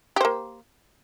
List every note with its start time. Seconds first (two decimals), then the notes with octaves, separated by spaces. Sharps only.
0.16 G4
0.21 C5
0.25 A#3